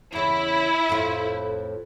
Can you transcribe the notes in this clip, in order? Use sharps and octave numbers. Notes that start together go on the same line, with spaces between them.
E2 C#3 E4
F2 A2 F4